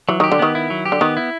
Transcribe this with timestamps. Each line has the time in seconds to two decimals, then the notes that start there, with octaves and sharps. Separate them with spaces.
0.08 E3 F#3
0.20 D#3 G4
0.32 D3
0.39 D#3 B3
0.55 E4
0.70 F#3
0.86 G4
0.92 D3
1.01 D#3 B3
1.17 E4